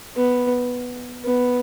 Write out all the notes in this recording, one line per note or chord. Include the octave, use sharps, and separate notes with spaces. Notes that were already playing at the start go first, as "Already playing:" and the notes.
B3
B3